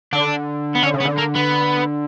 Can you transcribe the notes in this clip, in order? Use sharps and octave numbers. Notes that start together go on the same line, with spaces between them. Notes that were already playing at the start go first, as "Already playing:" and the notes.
D3 D4
B3
D3 C#4
C#3
B3
D3
A#3
B3